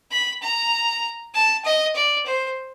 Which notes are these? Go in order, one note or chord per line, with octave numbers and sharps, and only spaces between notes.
B5
A#5
A5
D#5
D5
C5